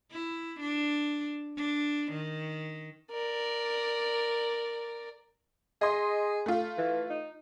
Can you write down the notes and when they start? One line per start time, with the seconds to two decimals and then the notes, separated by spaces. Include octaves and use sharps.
0.11 E4
0.60 D4
1.56 D4
2.12 D#3
3.11 A#4 D5
5.81 G#4 D#5 C6
6.46 A3 F4
6.78 E3
7.10 D#4